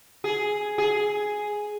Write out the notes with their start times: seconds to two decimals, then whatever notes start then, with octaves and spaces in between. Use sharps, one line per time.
0.24 G#4
0.78 G#4